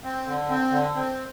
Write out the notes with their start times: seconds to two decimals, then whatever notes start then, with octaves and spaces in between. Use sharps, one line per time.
0.04 C4
0.27 D3
0.49 C4
0.72 D3
0.95 C4